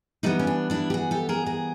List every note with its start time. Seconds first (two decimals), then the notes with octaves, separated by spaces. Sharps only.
0.23 E3 G3 B3 C#4 D#4
0.39 C#4
0.47 D4
0.70 D4 E4
0.90 G4
0.94 F#4 G#4
1.11 G4 A4
1.29 G#4 A#4
1.46 G#4 A#4